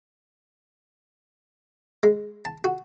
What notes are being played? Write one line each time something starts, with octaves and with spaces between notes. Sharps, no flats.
G#3
A5
F#4